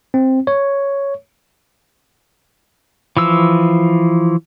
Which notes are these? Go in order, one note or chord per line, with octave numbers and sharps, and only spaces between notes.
C4
C#5
E3 F3 E6